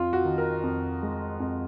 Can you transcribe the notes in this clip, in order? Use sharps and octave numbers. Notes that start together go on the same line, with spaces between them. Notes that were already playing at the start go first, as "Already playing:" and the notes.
Already playing: F2 F4
F#4
D#3
A#4
F2
G#3
F2